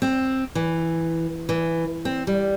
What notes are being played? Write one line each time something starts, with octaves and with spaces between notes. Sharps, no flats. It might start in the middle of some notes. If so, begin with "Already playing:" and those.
C4
E3
E3
C4
G3